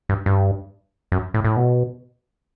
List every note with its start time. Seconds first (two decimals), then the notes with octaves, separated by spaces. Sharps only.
0.09 G2
0.26 G2
1.12 F#2
1.34 A2
1.45 A2
1.56 B2